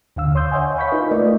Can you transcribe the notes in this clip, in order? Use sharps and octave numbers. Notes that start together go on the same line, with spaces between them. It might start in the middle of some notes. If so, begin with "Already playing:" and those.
D#2 D3 F5 E6
C#5 C6 D#6 G6
C#5 D#5 E5 F#5 G#5
D#5 F5 B5 C#6 G6 B6
D#4 F4 A#4 B4 F5
A3 F4 A#4 D5 D#5